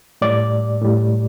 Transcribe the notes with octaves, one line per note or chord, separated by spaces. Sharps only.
A2 G3 D5
A2 G3